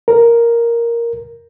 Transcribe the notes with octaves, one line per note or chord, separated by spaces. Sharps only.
A#4